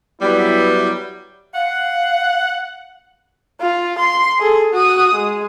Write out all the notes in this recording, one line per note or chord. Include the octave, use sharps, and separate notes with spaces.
F#3 G3 B3 E4
F5 F#5
F4
C6
G#4 A4
F#4 D#6
G#3